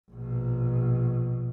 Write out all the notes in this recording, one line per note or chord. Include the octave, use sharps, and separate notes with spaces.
A#1 B2